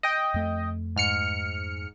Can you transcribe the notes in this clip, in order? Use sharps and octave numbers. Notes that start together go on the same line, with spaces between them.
D#5 G5
F2 A3
G#2 F6 C#7